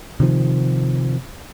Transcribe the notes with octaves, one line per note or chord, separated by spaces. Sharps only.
C3 D#3 F3